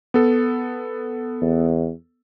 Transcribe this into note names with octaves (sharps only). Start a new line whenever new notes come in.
B3 A4
E2